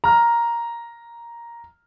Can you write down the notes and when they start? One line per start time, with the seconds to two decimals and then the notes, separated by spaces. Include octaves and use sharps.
0.04 A#5 F6